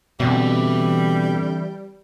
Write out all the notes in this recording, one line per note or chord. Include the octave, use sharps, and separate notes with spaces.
B2 D3 E3 G3 C4 E5